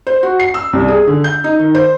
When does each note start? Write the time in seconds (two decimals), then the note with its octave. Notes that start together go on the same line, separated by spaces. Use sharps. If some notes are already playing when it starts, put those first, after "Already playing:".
0.07 C5
0.23 F#4
0.40 C7
0.54 E6
0.73 C2
0.88 G#4
1.07 D3
1.24 G6
1.44 D#4
1.59 D#3
1.75 C5